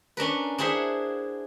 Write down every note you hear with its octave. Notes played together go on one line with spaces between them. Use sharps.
C#4 D4 A#4 B4
D4 E4 G#4 C5 E5 F#5